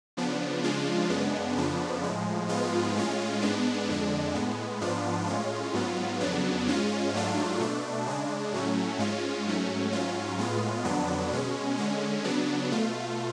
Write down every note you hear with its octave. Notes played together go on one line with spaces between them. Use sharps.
C#3 F3 B3 D4
C#3 F3 G#3 D4 F4
F#2 C#3 G#3 B3 D4
F2 C#3 F3 B3 D4
A2 F3 G#3
G#2 F3 G#3 B3 F4
A2 G#3 C#4 F4
G#2 G#3 B3 D4
F2 D3 G#3 D4
A2 G#3 B3
G#2 F3 B3 D4 F4
A2 G#3 C#4 F4
G#2 F#3 B3 F4
F2 C#3 F#3 B3 D4
G#2 G#3 C#4 F4
G#2 F#3 A3 D4 F4
B2 A3 D4
C#3 G#3 D4
A2 F#3 A3 C#4
G#2 G#3 C#4 F4
G#2 F#3 A3 C#4
G#2 F#3 C#4 F4
A2 G#3 B3 F4
F2 D3 F#3 B3 D4
B2 G#3 C#4
D3 G#3 C#4
C#3 F#3 B3 D4
B2 A3 F4